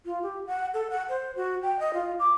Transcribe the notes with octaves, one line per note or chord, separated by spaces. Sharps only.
F4
G4
F#5
A4
F#5
C5
F#4
G5
D#5
F4
D6